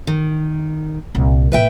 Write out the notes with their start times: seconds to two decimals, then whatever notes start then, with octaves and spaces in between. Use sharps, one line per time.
0.07 D#3
1.15 C2 A#2
1.52 A2 A#3 B4 E5 G5